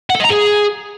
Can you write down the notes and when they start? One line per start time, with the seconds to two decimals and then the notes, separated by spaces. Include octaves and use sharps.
0.10 F#5
0.15 A4
0.20 D#5
0.25 A#5
0.30 G#4